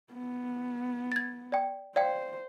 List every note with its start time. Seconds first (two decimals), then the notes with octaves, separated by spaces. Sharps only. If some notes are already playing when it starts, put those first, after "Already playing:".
0.13 B3
1.12 G#6 A6
1.52 D5 G5
1.96 C5 D5 F5 G5